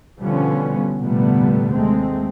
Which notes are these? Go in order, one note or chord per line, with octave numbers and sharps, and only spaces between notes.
B2 D3 F3 G3 B3 C#4
F1 A#2 D3 G3 A3 B3
D#2 G#3 A3 C4